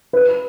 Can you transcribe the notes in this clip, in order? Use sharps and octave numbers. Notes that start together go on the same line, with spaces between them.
B4